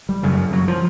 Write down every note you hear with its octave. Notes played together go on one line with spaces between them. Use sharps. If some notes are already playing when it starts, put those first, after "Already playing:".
G3
F#2 C#3
F#3
F3